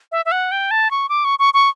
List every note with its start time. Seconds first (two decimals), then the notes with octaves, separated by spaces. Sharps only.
0.12 E5
0.26 E5
0.32 F#5
0.52 G5
0.71 A5
0.91 C#6
1.09 D6
1.25 C#6
1.39 C#6
1.54 C#6